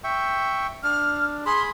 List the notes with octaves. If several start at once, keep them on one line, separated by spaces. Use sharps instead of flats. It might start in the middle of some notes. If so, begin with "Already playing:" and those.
E5 G5 C#6
D4 F6
G#4 B5 C6